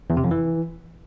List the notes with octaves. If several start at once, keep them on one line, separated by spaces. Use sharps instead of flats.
E2
C3
F2
E3